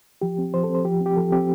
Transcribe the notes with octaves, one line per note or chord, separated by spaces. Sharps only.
F3 G4
C4
F3 C5
A4
C4 C5
F3 G4
C4
G4
F3 A4
C4 G4